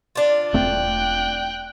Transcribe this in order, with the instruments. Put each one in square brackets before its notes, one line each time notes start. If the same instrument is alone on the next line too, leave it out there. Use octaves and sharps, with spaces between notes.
[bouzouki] D4 F4
[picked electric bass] E1 A3 C4 [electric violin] G5 F#6